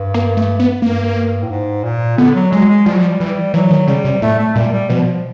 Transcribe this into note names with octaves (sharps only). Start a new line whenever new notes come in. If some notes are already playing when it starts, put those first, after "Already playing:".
Already playing: G2
A#3
A3
B3
G2 A#3
A2
G#2
A#2
D3 B3
F#3
F#3 G#3
G#3
F3 G3
F#3
F3
E3 G3
E3 F#3
D#3
C#3 G3
C3
A2 A3
A3
A#2 G3
G3
B2 F3